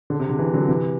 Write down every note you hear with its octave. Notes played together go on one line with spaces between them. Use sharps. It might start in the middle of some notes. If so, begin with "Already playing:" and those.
D3
C3
D3
C3 E3
D3 F#3
C3 E3